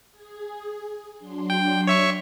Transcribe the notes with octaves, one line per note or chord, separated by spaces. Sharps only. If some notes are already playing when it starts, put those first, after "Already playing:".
G#4
F#3 D4 C6
G5
C#5 E5 C#6